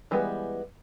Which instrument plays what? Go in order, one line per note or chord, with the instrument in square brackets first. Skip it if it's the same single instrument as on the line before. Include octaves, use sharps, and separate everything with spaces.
[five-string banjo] E3 G3 G#3 B3